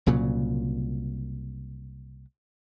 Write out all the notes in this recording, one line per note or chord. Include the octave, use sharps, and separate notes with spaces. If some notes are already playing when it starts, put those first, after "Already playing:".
C2 A#2 C#3 F#3